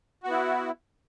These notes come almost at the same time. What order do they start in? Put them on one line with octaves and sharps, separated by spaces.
F#4 B3 E4